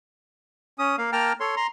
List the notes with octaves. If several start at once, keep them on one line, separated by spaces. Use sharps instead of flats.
C#4 D#6
A#3 F5
A#3 G5 A5 A#5 F6
A4 C#5 C6
A#5 C6